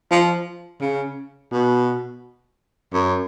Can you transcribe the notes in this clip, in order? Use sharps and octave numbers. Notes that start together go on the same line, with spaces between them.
F3
C#3
B2
F#2